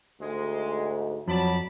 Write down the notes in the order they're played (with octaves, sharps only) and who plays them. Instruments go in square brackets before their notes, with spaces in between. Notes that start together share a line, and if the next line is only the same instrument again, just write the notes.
[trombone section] D2 G#2 [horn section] G#3
[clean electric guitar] F2 [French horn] F#3 [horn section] D5 A5 B5